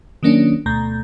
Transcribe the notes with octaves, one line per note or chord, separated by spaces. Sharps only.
D#3 F#3 A#3 C#4 D4
D2 B2 A3 A#5 G6